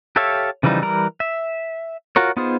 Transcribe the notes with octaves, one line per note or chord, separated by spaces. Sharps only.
G4 A4 C#5 E5 F5
C#3 E3 F3 G3 D#4
E3 G3 A#4 A#5
E5
F4 F#4 A#4 C#5
B3 D#4 F4 G#4 C5